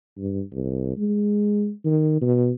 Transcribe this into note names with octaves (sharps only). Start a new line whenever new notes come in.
G2
C2
G#3
D#3
B2